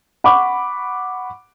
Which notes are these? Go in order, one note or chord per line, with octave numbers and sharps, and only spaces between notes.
F#5 B5 C#6 D6